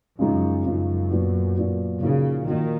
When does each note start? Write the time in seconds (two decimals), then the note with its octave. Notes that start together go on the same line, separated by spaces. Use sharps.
0.19 F#2 C#3 F3 G#3 D#4
0.65 F#2 C#3 F3 G#3 D#4
1.11 A#2 F#3 B3 F#4
1.57 A#2 F#3 B3 F#4
2.02 A#2 C#3 F3 A#3 D#4 F#4
2.47 A#2 D#3 F3 A#3 D#4 F#4